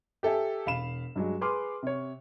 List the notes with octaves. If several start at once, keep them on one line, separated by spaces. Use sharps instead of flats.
G4 A4 E5 G#5
E1 F5 B5 E7
G2 F#3 G#3
G#4 B4 C6 D6 F6
C3 C#5